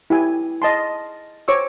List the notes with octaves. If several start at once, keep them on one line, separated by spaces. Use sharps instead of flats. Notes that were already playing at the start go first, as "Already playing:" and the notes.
E4 G4 G#5
D#5 A5 C6
C5 C#5 C#6 D6 E6